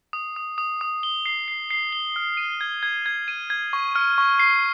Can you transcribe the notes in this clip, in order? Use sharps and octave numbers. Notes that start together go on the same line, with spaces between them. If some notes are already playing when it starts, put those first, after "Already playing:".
D#6
D#6
D#6
D#6
G7
C7
C7
C7
G7
F6
D#7
G#6
G#6
G#6
D#7
G#6
C#6
F6
C#6
C7